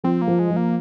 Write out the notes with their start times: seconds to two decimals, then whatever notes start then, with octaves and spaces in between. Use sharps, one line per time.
0.04 F3 C4
0.22 A#3
0.27 F3
0.39 G#3
0.50 F3
0.57 A#3